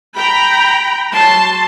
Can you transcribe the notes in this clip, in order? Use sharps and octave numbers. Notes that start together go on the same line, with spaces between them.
G5 A#5 B5
F#3 A5 C6